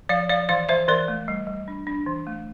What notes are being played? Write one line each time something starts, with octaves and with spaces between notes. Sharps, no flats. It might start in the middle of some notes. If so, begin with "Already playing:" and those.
F3 D5 F5
F3 D5 F5
E3 D5 F5
E3 C5 E5
E3 A#4 D5
A3
G3
G3
D4
D4
E3
A3